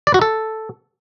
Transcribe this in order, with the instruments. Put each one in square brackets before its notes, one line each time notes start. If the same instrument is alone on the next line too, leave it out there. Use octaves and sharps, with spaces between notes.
[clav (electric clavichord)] D5
F#4
A4